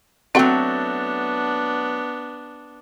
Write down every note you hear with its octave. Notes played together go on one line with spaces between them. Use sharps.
F#3 A3 B3 C4 D4 F#4 F#5 G5